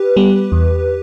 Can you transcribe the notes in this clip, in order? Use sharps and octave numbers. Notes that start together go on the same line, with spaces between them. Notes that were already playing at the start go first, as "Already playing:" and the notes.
Already playing: G4 B4
G3 B3
E2